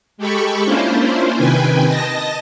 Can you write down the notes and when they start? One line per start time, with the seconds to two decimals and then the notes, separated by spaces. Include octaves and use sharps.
0.18 G#3 G4 A4 B5 C#6
0.65 A#3 C#4 D4 E4 F4 C5
1.34 C3 D#3 B4 G5 G#5
1.85 D#5 A5 A#6